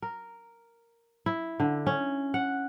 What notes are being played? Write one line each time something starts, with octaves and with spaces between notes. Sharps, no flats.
A#4
E4
D3
C#4
F#5